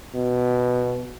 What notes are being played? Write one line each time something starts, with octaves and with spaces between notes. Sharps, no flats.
B2